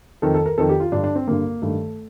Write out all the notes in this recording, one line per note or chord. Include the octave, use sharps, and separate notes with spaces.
F2 D#3 A4
A4
A#4
F2 D#3 A4
G4
F4
G2 D3 D4
D4
C4
G2 D3 A#3
G2 D#3 A3